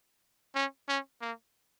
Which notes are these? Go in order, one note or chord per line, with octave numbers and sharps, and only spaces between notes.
C#4
C#4
A#3